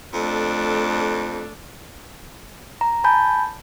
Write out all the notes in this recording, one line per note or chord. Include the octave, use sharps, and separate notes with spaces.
F2 A3 D4
A#5
G#5 A5 B5 G6